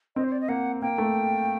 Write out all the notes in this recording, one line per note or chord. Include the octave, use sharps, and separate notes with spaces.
C4 D#5
C5
D5
D#5
A#3 F#5
A#3 G5
A3